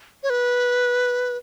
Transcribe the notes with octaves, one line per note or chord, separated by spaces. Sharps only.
C#5
B4